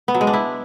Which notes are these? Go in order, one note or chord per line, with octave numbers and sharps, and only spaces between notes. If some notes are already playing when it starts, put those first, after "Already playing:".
B3
F#3
G#3
D4
E4